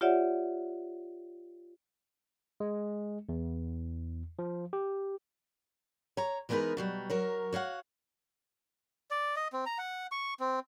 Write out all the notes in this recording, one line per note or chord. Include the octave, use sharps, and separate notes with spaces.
F4 G4 C#5 D5 E5 F#5
G#3
E2
F3
G4
C#5 A#5
E3 G#3 B3 D#4 A#4 B4
B2 F#3 G3
F#3 A#4 C#5
F#4 C#5 F5 F#5
D5
D#5
C4
A#5
F#5
C#6
C4